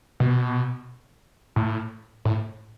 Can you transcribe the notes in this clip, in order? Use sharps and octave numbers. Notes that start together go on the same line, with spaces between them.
B2
A2
A2